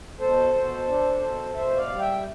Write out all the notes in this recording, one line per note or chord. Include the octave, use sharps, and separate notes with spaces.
B2 A4 C5
B2
D4
B2
B2 C5 E5
D5 F5
G3
E5 G5